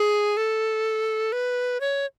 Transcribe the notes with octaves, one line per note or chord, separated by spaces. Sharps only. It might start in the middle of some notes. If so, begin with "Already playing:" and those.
Already playing: G#4
A4
B4
C#5